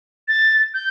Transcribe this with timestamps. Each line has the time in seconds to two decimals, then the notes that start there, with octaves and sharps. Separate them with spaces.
0.28 A6
0.74 G6